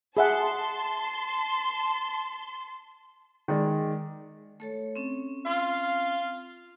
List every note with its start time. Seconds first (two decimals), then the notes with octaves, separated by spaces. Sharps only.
0.17 G#4 E5 F#5 A5 C6
3.48 D#3 G#3 D5
4.60 A3 A4 C#5
4.96 C4 C#4
5.46 F4 F5